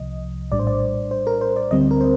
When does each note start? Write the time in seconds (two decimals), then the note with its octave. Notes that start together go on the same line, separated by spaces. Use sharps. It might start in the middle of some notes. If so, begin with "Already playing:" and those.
Already playing: C2 C3 F3 D#5
0.51 A#1 A2 G3 D4 D5
0.59 C5
0.67 D5
1.11 C5
1.27 A#4
1.41 C5
1.56 D5
1.71 D2 D3 G3 C4 D#5
1.81 C5
1.91 A#4
2.01 C5